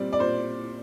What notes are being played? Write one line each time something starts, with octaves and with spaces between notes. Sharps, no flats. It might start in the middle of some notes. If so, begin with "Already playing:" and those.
Already playing: A#2 G3 C4 D5
D5
A#2 C5